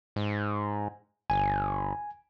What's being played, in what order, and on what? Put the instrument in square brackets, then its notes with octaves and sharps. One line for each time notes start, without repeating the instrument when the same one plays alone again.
[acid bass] G#2
[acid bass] G1 [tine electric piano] G#5